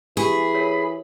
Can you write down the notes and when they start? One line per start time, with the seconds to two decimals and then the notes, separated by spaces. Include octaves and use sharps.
0.17 E3 G4 G#4 B5
0.55 A#4 C#5